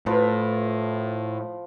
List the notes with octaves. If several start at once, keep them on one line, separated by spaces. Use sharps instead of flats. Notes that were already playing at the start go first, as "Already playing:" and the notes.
A2 F3 B4